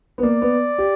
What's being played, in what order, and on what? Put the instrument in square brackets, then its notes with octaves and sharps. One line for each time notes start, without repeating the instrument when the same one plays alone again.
[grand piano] B3
[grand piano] A#3 [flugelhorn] D5
[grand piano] B3
G4